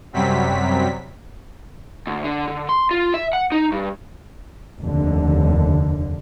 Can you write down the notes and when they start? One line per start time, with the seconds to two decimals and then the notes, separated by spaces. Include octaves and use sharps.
0.13 F#2 C3 F#3 G3 C4 B6
2.07 D2
2.24 D3
2.48 D3
2.69 C6
2.91 F4
3.14 E5
3.33 F#5
3.52 D#4
3.72 G2
4.79 F1 D#2 D3